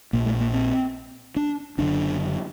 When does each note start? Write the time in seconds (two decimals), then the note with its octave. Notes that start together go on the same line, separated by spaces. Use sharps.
0.13 A#1 A#2 A#3
0.26 A3
0.41 A#3
0.54 C4
1.36 D4
1.78 F#1 F#2 D3 D4